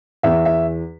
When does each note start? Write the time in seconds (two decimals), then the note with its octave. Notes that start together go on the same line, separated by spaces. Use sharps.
0.23 E2 E5
0.45 E5